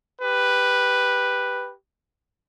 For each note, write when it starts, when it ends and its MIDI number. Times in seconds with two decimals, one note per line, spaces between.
0.22 1.73 67
0.22 1.73 71